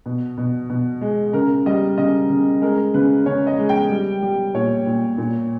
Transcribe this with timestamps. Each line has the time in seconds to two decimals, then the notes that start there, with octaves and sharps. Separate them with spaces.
0.06 B2
0.38 B2
0.70 B2
1.01 G#3
1.33 C#3 A#4
1.66 G3 D#5
1.98 C#3 D#5
2.30 C#3
2.62 G#3 A#4
2.94 C#3 B4
3.26 C#3 C#5
3.47 D#5
3.58 G#3
3.69 G5
3.90 G3
4.23 G3
4.54 A#2 C#5
4.86 A#2
5.18 A#2